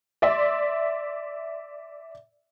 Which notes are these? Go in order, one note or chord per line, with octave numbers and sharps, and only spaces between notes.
D5 E5 C6